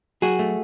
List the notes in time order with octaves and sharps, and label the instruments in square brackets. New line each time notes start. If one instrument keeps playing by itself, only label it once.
[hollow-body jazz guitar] F#3 F#4 G#4
A3